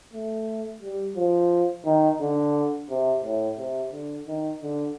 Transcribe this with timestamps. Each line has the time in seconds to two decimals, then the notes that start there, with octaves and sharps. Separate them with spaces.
0.13 A3
0.82 G3
1.16 F3
1.85 D#3
2.21 D3
2.90 C3
3.24 A2
3.58 C3
3.92 D3
4.27 D#3
4.62 D3